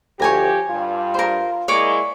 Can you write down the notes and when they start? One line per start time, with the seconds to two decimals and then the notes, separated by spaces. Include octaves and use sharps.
0.20 D2 F3 G4 C#5 G#5 A#5
0.69 G2 F4
1.14 A#4 C5
1.68 G#3 A#3 E4 C#5 D5 D6